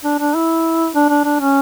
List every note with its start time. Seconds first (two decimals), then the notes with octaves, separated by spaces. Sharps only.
0.04 D4
0.19 D4
0.34 E4
0.95 D4
1.09 D4
1.25 D4
1.40 C#4